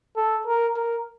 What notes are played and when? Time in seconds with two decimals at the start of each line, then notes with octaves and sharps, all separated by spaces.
0.17 A4
0.47 A#4
0.76 A#4